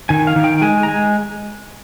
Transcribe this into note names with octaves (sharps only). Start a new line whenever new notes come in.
D#3 G#5
F5
D#3
G5
G#3 G#5
A#5
G#3 G#5